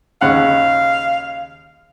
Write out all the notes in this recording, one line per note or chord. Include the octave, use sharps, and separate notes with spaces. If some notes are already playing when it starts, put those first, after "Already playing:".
D#2 C#3 F5 F#5